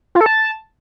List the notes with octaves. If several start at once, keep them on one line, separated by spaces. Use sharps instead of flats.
F4
A4
A5